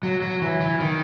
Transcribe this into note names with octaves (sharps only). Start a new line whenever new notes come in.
F#3
F#3
E3
E3
D#3